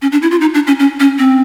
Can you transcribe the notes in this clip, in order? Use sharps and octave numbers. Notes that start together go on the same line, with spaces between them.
C#4
D4
E4
F4
D#4
D4
C#4
C#4
C#4
C4